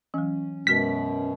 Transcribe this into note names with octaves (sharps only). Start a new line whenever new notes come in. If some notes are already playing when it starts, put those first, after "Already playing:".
E3 F#3 C#4
F#2 B2 G#3 F#4 A#4 B6